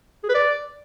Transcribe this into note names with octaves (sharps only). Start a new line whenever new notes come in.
G#4
B4
D5